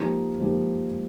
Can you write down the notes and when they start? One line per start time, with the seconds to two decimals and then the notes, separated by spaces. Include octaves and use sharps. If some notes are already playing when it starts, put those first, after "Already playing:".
Already playing: F3 A#3 D#4 G4
0.40 F3 A#3 D#4 G4